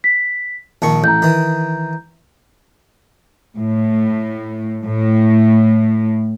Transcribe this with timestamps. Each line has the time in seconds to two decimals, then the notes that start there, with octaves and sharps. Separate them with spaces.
0.04 B6
0.82 A#1 D#3 A5 C#6
1.04 A1 A#5 G6
1.22 D#3 E3
3.57 A2
4.85 A2